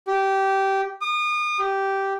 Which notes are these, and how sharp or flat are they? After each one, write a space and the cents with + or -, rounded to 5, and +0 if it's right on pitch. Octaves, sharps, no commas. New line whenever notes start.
G4 -15
D#6 -35
G4 -10